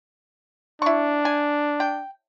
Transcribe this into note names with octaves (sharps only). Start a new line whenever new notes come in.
D4 E4 C#6
G#5
G5